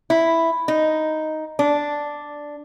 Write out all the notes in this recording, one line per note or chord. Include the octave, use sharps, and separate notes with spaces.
E4
D#4
D4